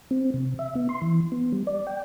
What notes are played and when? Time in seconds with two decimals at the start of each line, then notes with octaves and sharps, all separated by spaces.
0.11 C4
0.34 C3
0.59 E5
0.75 B3
0.89 C6
1.02 E3
1.32 B3
1.52 G3
1.67 D5
1.87 G5